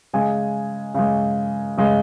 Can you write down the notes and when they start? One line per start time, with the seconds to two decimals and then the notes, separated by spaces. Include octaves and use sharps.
0.13 C#3 G#3 G#5
0.94 C#3 G#3
1.78 C#3 G#3